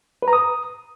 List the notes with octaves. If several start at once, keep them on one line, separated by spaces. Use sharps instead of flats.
B4
A#5
D#6